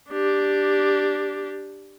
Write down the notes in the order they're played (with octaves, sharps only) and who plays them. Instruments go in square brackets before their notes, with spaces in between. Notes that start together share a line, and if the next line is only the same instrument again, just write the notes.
[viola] D4 G4